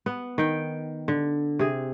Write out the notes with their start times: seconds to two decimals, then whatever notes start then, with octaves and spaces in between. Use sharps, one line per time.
0.06 B3
0.38 D#3 G5
1.08 D3
1.59 C3 G#4